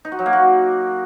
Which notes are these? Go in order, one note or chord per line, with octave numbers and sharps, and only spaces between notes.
D#4
F#4
F#3
A#3
F#4